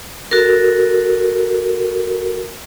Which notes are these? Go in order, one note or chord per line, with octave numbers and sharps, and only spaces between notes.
F#4 A4 A#4